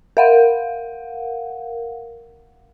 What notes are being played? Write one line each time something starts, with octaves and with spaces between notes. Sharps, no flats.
A#4 F5 F#5